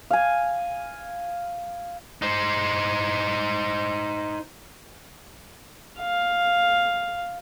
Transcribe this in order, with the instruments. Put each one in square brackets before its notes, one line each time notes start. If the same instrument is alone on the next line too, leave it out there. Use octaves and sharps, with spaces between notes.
[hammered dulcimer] F5 G#5
[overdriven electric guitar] D#4 C5
[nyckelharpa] F5